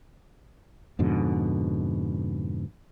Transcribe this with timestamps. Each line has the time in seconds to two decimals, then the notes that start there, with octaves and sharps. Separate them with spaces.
0.99 F2 G#2 B2 D3